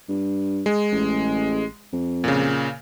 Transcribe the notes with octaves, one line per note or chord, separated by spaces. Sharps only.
G2
G#3
A1
F2
A#2 C#3